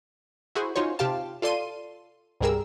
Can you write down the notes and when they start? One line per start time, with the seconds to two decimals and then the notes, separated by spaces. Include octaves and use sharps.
0.55 E4 F#4 G#4 C5
0.76 C#4 D#4 F4 F#4 C5 C#5
0.99 C3 F4 G4 F5 A5
1.42 F4 A4 D5 C6 D#7
2.40 C2 G2 G3 G#4 A#4 E6